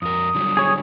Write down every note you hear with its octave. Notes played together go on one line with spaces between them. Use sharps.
F2 A#4 D#6
D3 F#3 G3
G#4 C#5